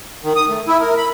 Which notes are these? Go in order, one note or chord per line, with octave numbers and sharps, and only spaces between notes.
D#3
D#6
A3
E4
A#4
B5